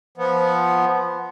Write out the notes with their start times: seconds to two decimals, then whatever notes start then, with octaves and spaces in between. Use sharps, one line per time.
0.18 F3 B3